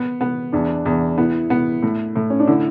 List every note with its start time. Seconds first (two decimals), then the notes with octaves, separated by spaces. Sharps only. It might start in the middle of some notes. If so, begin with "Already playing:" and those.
Already playing: B3
0.21 B3
0.52 E2 D4
0.86 E2
1.18 B3 E4
1.50 B3
1.83 A2
2.16 A2
2.30 C#4
2.39 D4
2.47 D3 E4